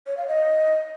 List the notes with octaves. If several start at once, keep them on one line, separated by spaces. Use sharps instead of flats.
C#5
F5
D#5